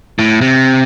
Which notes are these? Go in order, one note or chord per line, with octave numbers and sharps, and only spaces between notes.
A2
C3